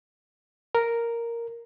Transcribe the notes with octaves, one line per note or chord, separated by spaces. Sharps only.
A#4